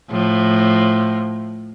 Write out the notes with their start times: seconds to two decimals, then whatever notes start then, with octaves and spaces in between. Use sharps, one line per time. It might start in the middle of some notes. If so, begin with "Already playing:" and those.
0.10 A2 F3